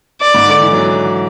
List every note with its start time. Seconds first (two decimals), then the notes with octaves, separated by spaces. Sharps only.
0.21 D5
0.34 G#2
0.47 D3
0.60 E3
0.73 F#3